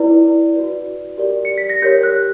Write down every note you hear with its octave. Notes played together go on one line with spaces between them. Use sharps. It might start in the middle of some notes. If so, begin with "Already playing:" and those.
Already playing: E4 B4 D5
F#4 B4 D5
G4 A#4 D5
C#7
B6
A#6
G4 A#4 C#5 G6
F#6